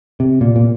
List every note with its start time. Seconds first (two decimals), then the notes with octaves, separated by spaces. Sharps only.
0.20 C3
0.41 A#2
0.56 A#2